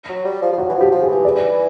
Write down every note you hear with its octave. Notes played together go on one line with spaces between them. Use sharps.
F#3
G3
F3
F3
F#3 F#4
E3
F3
G4
F3
G#4
E3
D5